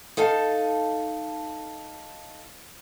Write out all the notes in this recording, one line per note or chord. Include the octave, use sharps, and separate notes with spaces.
D#4 A4 F5 A5